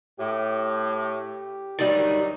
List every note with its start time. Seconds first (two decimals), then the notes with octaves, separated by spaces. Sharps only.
0.19 A2 G4
1.79 D2 D#3 F#3 G3 D#4